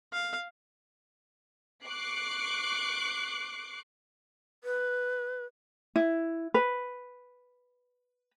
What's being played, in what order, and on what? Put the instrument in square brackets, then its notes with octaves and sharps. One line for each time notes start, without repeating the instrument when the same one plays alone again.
[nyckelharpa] F5
[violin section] C#6 D6 F#6 C7
[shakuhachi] B4
[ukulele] E4
B4